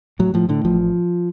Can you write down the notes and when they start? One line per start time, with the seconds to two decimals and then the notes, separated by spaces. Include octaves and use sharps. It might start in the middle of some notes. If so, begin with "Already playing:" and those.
0.19 A2 F#3
0.34 A2 F3
0.49 A2 D3
0.65 A1 F3